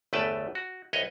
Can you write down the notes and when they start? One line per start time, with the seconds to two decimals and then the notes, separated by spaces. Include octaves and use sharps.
0.13 G1 E2 A3 B4 G5 A5
0.55 F#4
0.93 C2 B4 C#5 D#5